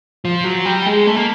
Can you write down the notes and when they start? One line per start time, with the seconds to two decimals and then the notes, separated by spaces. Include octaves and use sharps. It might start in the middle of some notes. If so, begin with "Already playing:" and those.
0.25 F3
0.44 F#3
0.65 G3
0.86 G#3
1.07 A3
1.16 A#3